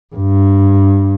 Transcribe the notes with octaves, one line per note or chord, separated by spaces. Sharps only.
G2